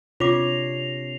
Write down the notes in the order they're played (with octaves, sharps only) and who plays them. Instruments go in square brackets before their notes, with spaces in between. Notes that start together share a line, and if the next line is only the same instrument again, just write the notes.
[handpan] C3 D4 C#5 [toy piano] F4 D6 [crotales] A#6 C7 F7